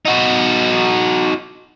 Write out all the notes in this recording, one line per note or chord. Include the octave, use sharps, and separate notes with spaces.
D#4 F#4